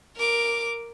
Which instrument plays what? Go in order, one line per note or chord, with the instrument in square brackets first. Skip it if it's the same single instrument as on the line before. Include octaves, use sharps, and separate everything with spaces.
[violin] A#4 D6